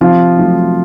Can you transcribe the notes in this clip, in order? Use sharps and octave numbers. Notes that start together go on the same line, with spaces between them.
C3 F3 F4
F#3 A3